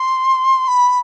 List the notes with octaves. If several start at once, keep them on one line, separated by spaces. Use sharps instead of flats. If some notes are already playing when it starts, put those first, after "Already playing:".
Already playing: C6
B5